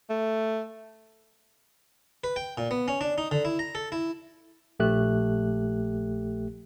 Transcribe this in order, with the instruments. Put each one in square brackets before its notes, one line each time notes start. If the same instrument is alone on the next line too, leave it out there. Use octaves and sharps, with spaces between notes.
[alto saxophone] A3
[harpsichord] B4
G5
A#2
B3
C#4
D4
D#4
D3
E4
A#5
A4
E4
[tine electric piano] A#1 A3 G4 F#6